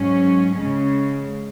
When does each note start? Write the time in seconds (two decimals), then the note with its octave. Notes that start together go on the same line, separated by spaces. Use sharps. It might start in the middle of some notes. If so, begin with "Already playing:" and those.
Already playing: G#2 F#3 C#4
0.57 C#3 G#3 C#4